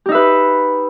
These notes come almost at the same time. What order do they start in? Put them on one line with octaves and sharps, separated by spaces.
G4 D#4 E5 B4